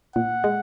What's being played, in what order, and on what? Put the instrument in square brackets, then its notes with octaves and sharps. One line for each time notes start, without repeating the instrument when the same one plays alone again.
[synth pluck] A#2 [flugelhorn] F#5
[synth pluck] G#3